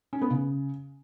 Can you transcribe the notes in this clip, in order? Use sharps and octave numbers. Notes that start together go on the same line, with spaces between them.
C#4
B3
C#3